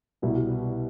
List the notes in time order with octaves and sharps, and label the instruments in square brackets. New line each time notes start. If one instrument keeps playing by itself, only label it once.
[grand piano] C2 B2 G3 B3 E4